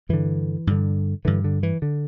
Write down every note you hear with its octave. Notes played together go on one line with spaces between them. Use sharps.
G2 D3 E3
G2 D3
G2 D3 E3
D3
E3
D3